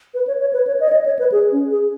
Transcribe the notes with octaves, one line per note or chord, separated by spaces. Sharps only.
B4
C#5
C#5
B4
C#5
D#5
C#5
D#5
C#5
B4
G#4
C#4
G#4